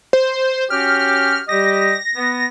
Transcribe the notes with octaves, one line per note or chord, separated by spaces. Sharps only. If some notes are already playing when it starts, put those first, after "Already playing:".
C5
C#4 F#4 G4 F6
G3 G4 D#5 A#6
B3